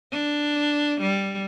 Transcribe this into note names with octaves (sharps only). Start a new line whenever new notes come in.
D4
G3